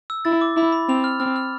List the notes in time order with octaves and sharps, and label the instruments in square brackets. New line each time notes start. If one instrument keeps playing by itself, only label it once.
[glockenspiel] E6
[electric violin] E4 [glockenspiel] A6
[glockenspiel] D6
[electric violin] E4 [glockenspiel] B5
[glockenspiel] B5
[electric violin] C4 [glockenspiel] F7
[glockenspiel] F6
[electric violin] C4 [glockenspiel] F6
[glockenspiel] F6